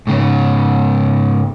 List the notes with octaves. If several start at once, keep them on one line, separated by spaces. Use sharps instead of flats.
G#2 C#3